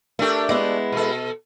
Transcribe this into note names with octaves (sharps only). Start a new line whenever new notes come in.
A3 D4 G4 A#4
G#3 B3 E4
B2 A4